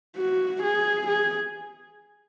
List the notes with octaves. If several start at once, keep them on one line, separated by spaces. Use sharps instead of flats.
F#4
G#4
G#4